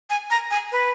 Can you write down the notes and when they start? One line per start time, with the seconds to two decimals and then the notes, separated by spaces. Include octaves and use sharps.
0.10 G#5
0.30 A#5
0.51 G#5
0.72 B4